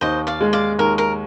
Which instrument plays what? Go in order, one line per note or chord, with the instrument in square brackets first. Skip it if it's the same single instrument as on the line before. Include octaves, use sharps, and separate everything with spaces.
[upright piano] D#2 [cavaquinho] C5 D#5
[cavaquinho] D5 F5
[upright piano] G#3
[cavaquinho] D5 F5
[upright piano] D#2 [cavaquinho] A#4
[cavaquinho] A#4